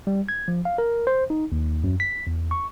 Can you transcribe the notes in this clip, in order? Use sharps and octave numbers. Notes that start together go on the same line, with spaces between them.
G3
G#6
F3
F5
A#4
C5
D#4
D#2
F#2
B6
E2
C#6